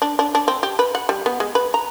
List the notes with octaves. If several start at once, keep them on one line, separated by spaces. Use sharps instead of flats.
D4
D4
D4
C4
G4
B4
F#5
G3
B3
G#3
B4
A#5